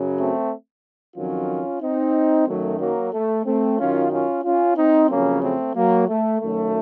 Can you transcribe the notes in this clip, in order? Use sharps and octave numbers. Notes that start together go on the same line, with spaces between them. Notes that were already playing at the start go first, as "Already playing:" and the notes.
Already playing: F#2 C#3 F#3
A3 C4
F2 D#3 F#3 C#4 F4
C4 D#4
F#2 D#3 F#3 A3
F#3 A#3
A3
A3 C4
F#2 D#3 F#3 C#4 F4
C#4 F4
C#4 F4
C4 D#4
F2 C#3 F#3 A#3 C#4
A3 C4
F#3 A#3
A3
F#2 D#3 F#3 A3